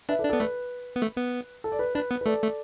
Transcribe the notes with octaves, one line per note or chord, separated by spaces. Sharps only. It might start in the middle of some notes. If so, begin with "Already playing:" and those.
D4 B4 E5
A4 D5
D4
B3 A4 D5
A3 B4
B3
A3
B3
A4
D5
B4
D4 B4
B3
B4
A3 A4 D5
A3